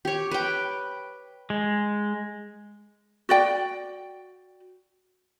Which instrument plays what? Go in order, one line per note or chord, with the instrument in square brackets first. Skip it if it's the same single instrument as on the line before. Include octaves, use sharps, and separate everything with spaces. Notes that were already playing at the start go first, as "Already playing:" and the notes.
[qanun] G4 C#5
B4 G5
[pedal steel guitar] G#3
[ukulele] F#4 D5 G5